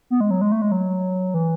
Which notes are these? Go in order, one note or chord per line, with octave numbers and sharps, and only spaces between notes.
B3
G#3
F#3
G#3
A3
G#3
F#3
E3